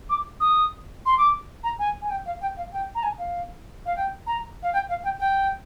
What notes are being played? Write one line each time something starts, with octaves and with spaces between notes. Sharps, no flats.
D6
D#6
C6
D6
A#5
G#5
G#5
G5
F5
G5
F5
G5
A#5
G#5
F5
F5
G5
A#5
F5
G5
F5
G5
G5